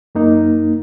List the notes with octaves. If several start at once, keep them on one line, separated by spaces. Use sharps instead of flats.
F#2 A#3 D#4